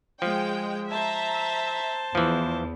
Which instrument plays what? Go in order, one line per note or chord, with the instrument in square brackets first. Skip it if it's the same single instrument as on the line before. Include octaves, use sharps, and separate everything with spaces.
[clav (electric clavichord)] F3 [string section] G#3 G5
[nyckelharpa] C5 A5 [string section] E5 A#5
[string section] E2 [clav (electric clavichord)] E3 F3